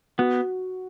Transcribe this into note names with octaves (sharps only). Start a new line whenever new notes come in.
B3 F#4